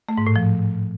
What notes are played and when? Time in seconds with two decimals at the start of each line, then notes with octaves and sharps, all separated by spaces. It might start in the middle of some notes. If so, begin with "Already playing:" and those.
0.09 A3
0.18 G#2
0.27 A2
0.36 F3